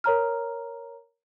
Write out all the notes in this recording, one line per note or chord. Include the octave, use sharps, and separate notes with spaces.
A#4 C#5 A#5 F6